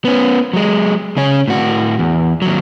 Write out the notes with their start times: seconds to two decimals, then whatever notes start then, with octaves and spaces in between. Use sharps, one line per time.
0.05 B3 C#4
0.53 F#3 G#3
1.17 C#3 C#4
1.48 A2 F#4
1.99 E2
2.42 D#2 F#3